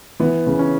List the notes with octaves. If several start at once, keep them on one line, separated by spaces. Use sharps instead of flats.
E3 B3
C#3
C#4